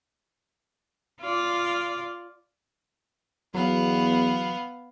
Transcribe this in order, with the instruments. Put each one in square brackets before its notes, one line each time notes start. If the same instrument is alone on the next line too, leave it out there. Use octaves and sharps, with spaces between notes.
[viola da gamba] F4 D5
[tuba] E2 [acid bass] F#3 [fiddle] B3 F5